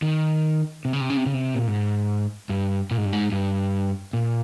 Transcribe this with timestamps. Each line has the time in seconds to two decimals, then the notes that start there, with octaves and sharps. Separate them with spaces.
0.02 D#3
0.85 C3
0.93 C#3
1.00 C3
1.10 C#3
1.17 C3
1.26 C#3
1.34 C3
1.55 A#2
1.67 G#2
2.49 G2
2.91 A#2
2.97 G#2
3.05 G2
3.13 G#2
3.32 G2
4.13 A#2